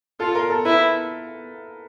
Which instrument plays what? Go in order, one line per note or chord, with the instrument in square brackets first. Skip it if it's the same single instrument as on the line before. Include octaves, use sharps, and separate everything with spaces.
[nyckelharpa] F4 [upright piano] A4
[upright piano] A#4
A4
[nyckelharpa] E4 [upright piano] B4